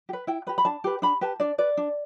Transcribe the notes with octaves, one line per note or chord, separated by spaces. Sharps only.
G4
B4
E4 G5
G4 B4 B5
B5
D4 A5
G4 B4
D4 B5
G4 B4 A5
D4 D5
B4 D5
D4